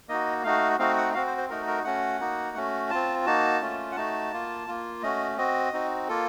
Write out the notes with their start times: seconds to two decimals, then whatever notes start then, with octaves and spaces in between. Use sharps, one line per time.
0.08 A#3 D#4 F#4 D#5
0.44 A3 D#4 F#4 F5
0.79 A3 C4 D#4 F#4 F5
0.97 F#5
1.14 C4 F#4 F5
1.26 C5
1.38 C5
1.49 A3 D#4 F#4 A#4
1.67 A#4
1.84 A3 C#4 F#4 F#5
2.20 A#3 D#4 F#4
2.55 A3 C#4 F#4
2.90 C4 F4 A5
3.26 A#3 D#4 F#4 A5
3.61 A3 C#4 F4
3.92 F#5
3.96 A3 D#4 F#4 A5
4.32 A#3 F4
4.68 A#3 F4
5.02 A3 C#4 F#4 D#5
5.38 C4 F#4 D#5
5.73 C4 D#4 F#4
6.08 A#3 F4 A4